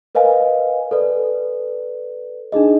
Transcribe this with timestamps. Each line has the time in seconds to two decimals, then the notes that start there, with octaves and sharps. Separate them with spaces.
0.15 A#4 B4 D#5 F5 G#5
0.91 A4 B4 D5
2.52 D4 D#4 G#4 D#5